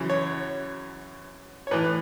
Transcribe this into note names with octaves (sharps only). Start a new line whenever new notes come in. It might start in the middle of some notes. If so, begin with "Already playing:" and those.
Already playing: F#2 C#3 E3
C#5
C#5
A2 E3 B4